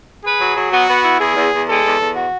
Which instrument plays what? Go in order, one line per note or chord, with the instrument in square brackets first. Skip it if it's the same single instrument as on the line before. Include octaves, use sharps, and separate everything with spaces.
[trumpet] G#4 [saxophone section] B4
[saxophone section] F#3
F#3
[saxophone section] B3 [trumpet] F#4
[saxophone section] B3
E4
[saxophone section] E2 [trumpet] G#4
[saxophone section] E2
E2
[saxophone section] G#3 [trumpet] A4
[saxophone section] E2
E2
F#4